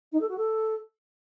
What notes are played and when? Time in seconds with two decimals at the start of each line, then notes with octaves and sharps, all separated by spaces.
0.12 D#4
0.21 A4
0.29 F#4
0.37 A4